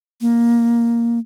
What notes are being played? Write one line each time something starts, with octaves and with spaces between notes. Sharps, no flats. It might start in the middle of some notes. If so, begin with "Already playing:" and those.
A#3